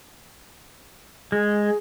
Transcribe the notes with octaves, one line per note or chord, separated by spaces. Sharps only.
G#3 G#4